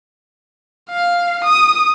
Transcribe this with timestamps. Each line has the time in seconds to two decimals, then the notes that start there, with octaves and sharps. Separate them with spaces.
0.90 F5
1.45 D#6